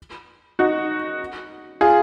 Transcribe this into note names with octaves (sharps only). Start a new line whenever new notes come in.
D#4 F#4
F4 G#4